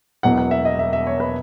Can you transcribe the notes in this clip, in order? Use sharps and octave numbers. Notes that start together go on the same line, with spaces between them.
E1 E2 B2 F#3 F#5
F#5
E5
D#5
E5
E5
C#5
B4